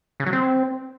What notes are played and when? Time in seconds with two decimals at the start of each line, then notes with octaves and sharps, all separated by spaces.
0.20 C#3
0.26 F#3
0.33 C4